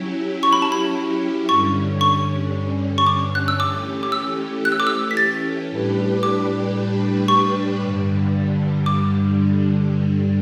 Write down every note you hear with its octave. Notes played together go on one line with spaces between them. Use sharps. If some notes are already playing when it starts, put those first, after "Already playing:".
Already playing: F#3 C#4 E4 G4
C#6
B5
A5
B5
G2 D3 G3 C#4 C#6
C#6
C#6
D6
F#6
E6
E3 A3 C#4 G4 D6
D6
E6
F#6
E6
D6
E6
B6
A6
A2 G3 D4 G4 B4
D6
C#6
G2 D3 G3
D6